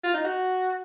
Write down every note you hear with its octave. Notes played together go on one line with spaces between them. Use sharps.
F4
D#4
F#4